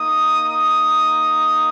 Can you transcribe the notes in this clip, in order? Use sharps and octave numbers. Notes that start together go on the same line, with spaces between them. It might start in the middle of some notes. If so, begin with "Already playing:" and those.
Already playing: A#3 D#4 D#6
D#6